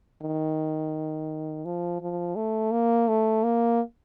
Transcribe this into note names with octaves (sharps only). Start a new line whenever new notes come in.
D#3
F3
F3
A3
A#3
A3
A#3